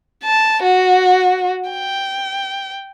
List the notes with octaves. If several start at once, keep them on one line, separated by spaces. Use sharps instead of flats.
A5
F#4
G5